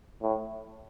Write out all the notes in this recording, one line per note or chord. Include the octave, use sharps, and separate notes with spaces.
A2